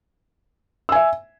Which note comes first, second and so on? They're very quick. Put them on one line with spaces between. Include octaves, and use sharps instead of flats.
E6 G#5 E5